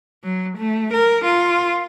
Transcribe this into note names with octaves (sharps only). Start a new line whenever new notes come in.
F#3
A3
A#4
F4